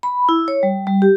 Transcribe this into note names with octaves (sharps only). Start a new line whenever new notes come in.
B5
E4
C#5
G3
G3
G4